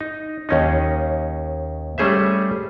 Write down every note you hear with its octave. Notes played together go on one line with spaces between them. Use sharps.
D#4
D#2 C#4 D#4
G3 A3 C#4 G#4 C5 E5